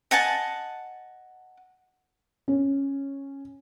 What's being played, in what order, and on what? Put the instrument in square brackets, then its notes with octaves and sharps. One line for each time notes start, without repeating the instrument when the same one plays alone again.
[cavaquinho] D#5 F#5 G#5 A5
[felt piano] C#4